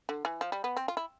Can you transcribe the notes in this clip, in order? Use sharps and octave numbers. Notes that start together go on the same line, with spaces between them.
D3
E3
F3
G3
B3
C4
F4
E4